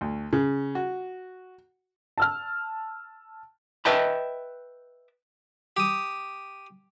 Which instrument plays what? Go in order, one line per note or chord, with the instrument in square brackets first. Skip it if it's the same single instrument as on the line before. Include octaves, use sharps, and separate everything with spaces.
[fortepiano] D2
C#3
F#4
[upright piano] A5 E6 F6
[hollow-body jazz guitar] B4 D#5 E5 G5 A5 B5
[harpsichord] G4 D#6